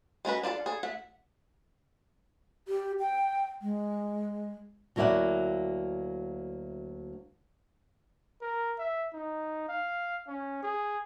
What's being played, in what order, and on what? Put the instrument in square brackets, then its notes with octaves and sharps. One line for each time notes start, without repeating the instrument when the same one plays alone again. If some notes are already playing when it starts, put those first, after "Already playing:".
[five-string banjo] G#3 C#4 F#4 B4
D4 F4 G#4 A4
G#4 A4
A3 E5 F#5
[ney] G4
G5
G#3
[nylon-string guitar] D2 F#3 A#3 E4 D5 F#5
[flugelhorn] A#4
E5
D#4
F5
C#4
G#4